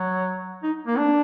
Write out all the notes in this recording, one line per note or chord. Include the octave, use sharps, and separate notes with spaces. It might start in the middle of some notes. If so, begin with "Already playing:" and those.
Already playing: F#3
D#4
A#3
D4